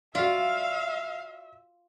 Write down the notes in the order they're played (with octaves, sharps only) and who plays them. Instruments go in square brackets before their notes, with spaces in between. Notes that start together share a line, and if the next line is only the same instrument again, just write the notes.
[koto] F4 [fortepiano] F#4 D5 [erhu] E5 [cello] F5